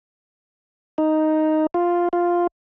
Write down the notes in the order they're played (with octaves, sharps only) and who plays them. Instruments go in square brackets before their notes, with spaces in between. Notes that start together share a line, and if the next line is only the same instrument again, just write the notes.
[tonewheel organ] D#4
F4
F4